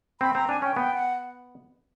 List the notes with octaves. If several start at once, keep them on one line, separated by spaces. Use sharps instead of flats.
C4 B5
C4 A#5
D4 G#5
C#4 G5
B3 G5
F#5